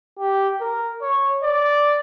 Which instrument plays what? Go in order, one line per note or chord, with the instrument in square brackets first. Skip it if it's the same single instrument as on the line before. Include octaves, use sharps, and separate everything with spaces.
[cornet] G4
A#4
C#5
D5